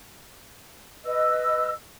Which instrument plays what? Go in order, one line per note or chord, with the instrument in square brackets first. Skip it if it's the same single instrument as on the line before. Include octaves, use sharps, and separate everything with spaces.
[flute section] B4 D#5 E6